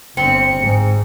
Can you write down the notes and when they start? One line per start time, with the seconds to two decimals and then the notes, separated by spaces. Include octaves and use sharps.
0.17 G1 C4 C#7
0.62 G#2